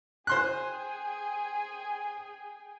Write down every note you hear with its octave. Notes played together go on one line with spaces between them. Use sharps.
G#4 C5 G5 G#5 C6 F#6